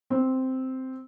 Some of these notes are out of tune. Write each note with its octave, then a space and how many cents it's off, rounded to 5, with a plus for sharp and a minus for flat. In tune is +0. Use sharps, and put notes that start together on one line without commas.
C4 -5